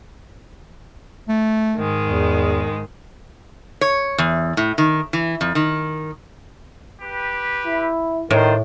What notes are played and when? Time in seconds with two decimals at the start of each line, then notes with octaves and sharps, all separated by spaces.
1.29 A3
1.75 G#2 D#3 G#3
2.07 E2
3.81 C#5
4.18 E2
4.57 A2
4.78 D#3
5.13 E3
5.41 F2
5.55 D#3
7.01 G4 B4
7.66 E4
8.30 A2 D#3 D4 F4 C5